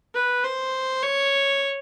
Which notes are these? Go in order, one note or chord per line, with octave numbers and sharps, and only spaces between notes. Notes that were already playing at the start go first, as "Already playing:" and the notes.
B4
C5
C#5